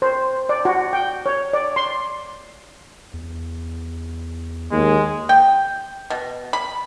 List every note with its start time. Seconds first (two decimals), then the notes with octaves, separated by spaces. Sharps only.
0.02 C5
0.49 D5
0.65 F#4
0.93 G5
1.26 C#5
1.53 D5
1.76 C6
3.14 E2
4.71 D#2 G#3
5.29 G5
6.10 B2
6.53 B5